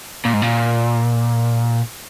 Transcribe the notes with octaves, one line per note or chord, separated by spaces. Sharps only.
A#2
G#2
A#2